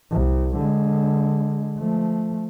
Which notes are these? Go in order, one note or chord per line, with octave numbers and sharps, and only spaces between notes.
C2
D3 G#3
F3 A3